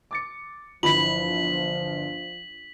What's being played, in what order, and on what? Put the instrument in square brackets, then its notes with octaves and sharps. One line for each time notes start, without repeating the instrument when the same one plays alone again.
[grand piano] D6 A6 C#7
[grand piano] G1 E3 [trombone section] F3 [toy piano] F4 B5 [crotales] B6 F#7